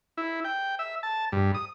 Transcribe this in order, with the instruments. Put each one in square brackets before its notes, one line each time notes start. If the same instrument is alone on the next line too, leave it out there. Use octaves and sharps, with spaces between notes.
[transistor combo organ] E4
G5
E5
A5
G2
D#6